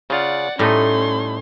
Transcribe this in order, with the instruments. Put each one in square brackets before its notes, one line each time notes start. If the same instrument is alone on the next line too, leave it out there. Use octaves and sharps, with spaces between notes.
[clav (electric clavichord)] C#3 F4 [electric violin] D5 F#5
[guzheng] A2 [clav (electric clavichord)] G3 A3 D#4 [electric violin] C#4 C6